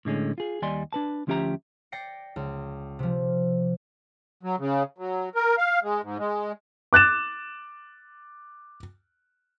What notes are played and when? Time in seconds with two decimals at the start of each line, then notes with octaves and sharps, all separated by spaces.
0.05 A2 D3 G#3 C#4
0.38 F4 G#4
0.62 D#2 G3 D5 D#5 G#5 C6
0.93 D4 B4 A5
1.27 D2 F3 C#4 G4 E5 A#5
1.92 D5 G5 A#6 C7 C#7
2.36 C#2
2.99 C3 F3
4.43 F#3
4.59 C#3
4.98 F#3
5.35 A#4
5.58 F5
5.83 G#3
6.03 G#2
6.19 G#3
6.93 D6 F#6 A6 E7